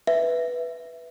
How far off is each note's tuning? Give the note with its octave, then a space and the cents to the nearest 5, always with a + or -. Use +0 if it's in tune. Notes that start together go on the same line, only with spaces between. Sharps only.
B4 +0 E5 +0